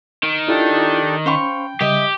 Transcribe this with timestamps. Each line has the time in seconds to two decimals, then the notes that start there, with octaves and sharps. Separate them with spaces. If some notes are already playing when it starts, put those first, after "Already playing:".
0.23 D#3
0.48 D4 E4 F4 G4 A4
1.26 C#4 C5 F5 G5 B5 C#6
1.81 C#3 G3 G4 D#5 E5